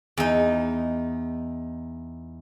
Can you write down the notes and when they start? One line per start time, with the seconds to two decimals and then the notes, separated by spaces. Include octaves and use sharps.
0.17 E2 D#4